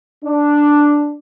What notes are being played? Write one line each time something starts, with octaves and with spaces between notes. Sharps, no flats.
D4